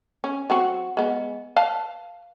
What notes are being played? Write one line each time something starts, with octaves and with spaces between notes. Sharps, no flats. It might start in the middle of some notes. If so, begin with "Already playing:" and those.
C#4
F#3 C4 F#4
G#3 B3
B4 F5 A5